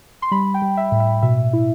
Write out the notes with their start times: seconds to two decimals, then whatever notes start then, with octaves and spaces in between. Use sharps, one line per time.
0.22 C6
0.31 G3 B5
0.54 G5
0.62 G3
0.77 E5
0.92 A2
1.00 E5
1.22 B2 E5
1.53 E4